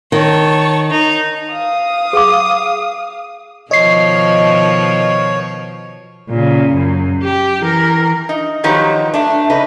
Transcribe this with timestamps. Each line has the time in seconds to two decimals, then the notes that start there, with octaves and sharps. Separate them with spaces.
0.12 D#3 C#5 A5
0.91 D#4
1.52 F5 D#6
2.13 G#4 F#5 D6
3.71 B2 D#3 F3 C#5 D#5 C7
6.30 A#2 C#3
6.73 F#2
7.23 G4
7.61 E3 A#4
8.29 D#4
8.64 D#3 F3 F#3 D#4 G4 B4
9.14 A3 D4
9.50 C#3 D#4 B4